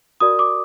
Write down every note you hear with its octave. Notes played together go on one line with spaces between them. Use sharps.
F#4 A#4 D5 D#6
D6